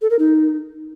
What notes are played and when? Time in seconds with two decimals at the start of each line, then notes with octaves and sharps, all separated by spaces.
0.01 A4
0.10 A#4
0.19 D#4